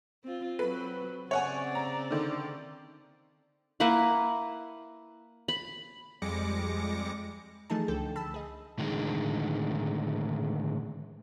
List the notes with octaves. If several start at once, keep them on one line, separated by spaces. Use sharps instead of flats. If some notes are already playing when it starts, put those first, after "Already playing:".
C4 F4
F#3 C4 B4
C#3 C4 C#5 D5 F#5 G#5
A#5
D3 D#3
A#3 E4 B4 F#5
B5
F2 G3 G#3 D6 A#6 C#7
E3 F3 A3 D#4 G#4 A5
C#2 D3 A4 G5
A5 B5 E6
G#4 D#5
A2 D3 D#3 G#3